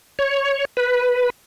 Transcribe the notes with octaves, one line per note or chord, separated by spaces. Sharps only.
C#5
B4